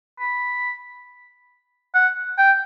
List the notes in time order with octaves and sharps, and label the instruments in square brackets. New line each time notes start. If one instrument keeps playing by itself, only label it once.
[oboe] B5
F#5
G5